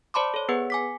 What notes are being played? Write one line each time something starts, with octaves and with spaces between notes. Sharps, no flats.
C5 D5 A5 B5 C6 D6
A4 C#5
B3 G#4 B4 F#5
G#5 D6 B6